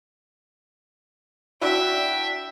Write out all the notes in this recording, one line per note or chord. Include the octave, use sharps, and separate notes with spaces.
D4 E4 F#4 E5 G5